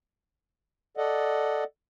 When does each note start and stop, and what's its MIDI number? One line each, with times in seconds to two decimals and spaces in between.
0.97 1.64 69
0.97 1.64 74
0.97 1.64 75
0.97 1.64 78